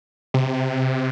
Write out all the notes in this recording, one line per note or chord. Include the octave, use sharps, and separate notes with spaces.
C3